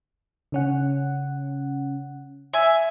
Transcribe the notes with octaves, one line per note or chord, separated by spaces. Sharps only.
C#3 C#4 F#5
E5 G#5